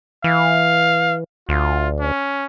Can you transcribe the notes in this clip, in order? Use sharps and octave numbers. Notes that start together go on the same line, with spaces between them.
E3 F5
D2 F4
C#4